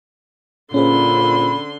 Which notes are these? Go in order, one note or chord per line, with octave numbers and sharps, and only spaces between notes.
A#2 D3 C#4 G#4 C5 B5 C6